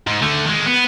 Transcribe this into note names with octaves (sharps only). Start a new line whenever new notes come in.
G#2
D3 A3
D#3 G#3
B3